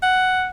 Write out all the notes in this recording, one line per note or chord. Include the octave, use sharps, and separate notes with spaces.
F#5